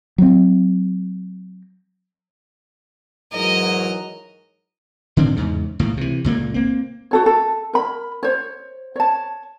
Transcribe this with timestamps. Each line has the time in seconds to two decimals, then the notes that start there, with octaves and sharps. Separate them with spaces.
0.18 F#3 C4
3.33 G#2 E3 F#3 A#4 D#5
5.17 A2 D3 C4 D4
5.36 E2 G#2 C#3
5.79 C#2 A2 A#3
5.97 C3 E3
6.24 C#2 A#2 A3 A#3
6.54 A#3 C4
7.11 F#4 A4 C#5
7.26 A4
7.73 A#4 B5
8.23 C5 C#5
8.96 C#5 A5